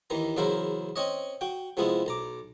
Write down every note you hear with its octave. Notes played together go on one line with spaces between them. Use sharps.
D#2 D#3 E3 A#5
E2 C#3 F#3 E4 A#4 C5
C4 C#4 C#5 D#5
F#4 G5
C3 F3 G#3 B3 E4
B1 A#5 D6